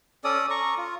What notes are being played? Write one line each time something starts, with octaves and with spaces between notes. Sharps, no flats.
C#4 A4 D5 D#6
A#5 C#6
F4